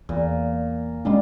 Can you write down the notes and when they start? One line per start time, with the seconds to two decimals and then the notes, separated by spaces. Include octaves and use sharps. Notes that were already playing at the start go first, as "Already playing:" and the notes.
0.09 E2 A#2
1.05 G3 G#3 C#4 D4 F4